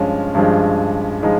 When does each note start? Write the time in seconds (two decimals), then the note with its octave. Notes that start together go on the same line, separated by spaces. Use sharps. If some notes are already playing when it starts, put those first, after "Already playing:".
Already playing: G2 F3 G#3 C#4
0.35 G2 F3 G#3
1.23 F3 G#3 D#4